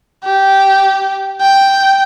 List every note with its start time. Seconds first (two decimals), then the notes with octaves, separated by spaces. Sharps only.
0.24 G4
1.41 G5